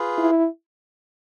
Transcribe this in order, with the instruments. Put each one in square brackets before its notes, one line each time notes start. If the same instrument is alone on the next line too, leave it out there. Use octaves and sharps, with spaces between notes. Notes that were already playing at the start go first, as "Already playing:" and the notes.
Already playing: [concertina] F4 G#4 B4
[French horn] E4